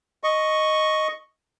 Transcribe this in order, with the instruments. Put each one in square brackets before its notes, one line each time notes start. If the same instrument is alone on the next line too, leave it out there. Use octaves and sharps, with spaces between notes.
[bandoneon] D#5 C#6